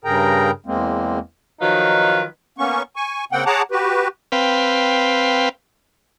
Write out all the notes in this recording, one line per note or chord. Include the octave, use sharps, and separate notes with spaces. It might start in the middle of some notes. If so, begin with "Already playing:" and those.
G2 C#3 G#4 A#4 G5 A#5
E2 G#3 A#3 C4
D#3 F3 F#3 D#4 F4 B4
A#3 B3 C#4 C#6
G#5 C#6
C#3 A#3 C4 F#5 G5
G#4 C#5 F#5 A5 A#5 D6
F#4 G4 B4
C4 B4 F5 G5